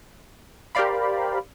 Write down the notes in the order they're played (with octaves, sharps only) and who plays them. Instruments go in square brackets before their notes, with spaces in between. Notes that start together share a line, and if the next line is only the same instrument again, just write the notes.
[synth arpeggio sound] G4 A#4 C5 D5 F5 B5